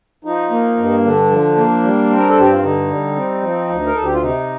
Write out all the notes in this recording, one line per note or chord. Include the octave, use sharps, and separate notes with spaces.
F3 D#4
A#3
G2
D3 D4
F3
A#3
G3
C4
A#4
A4
G2 G4
F4
D3 D#4
G3
C4
F3
D2
A#4
D2 A4
G4
F4
C3 D#4